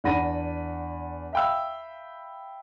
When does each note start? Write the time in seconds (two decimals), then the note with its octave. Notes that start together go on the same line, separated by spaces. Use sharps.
0.04 E2 D4 F#5 B5 A#6 D#7
1.33 E5 F5 G5 B5 E6